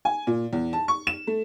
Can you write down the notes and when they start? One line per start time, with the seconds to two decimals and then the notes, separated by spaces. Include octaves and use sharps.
0.05 G#5
0.27 A#2
0.53 E2
0.73 A5
0.88 C#6
1.07 E7
1.27 A3